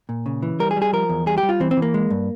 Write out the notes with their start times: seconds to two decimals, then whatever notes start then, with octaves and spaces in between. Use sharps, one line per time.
0.09 A#2
0.26 C#3
0.42 E3
0.60 G3 A#4
0.71 G#4
0.76 G3
0.82 G#4
0.93 F3 A#4
1.09 E2
1.26 G3 G#4
1.38 G4
1.43 G3
1.49 F4
1.60 E3 C4
1.71 C4
1.77 E3
1.82 A#3
1.94 G#3
2.10 G2